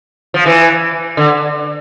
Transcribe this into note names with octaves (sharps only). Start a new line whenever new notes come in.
F3
E3
D3